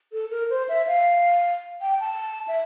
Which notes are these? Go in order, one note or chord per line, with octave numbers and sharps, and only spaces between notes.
A4
A#4
C5
E5
F5
G5
A5
E5